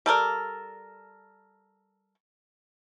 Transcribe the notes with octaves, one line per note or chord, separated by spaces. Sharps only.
G3 A4 A#4 D5